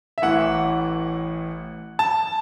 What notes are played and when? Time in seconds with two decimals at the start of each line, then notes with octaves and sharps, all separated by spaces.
0.18 E5
0.22 A1 A2 E3 F#5
1.99 A5